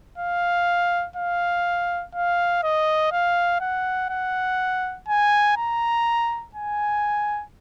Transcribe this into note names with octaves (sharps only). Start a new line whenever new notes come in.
F5
F5
F5
D#5
F5
F#5
F#5
G#5
A#5
G#5